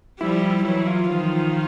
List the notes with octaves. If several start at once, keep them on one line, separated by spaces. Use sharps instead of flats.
F3 G3 E4
E4
E3 F#3 E4
F4
D#3 F3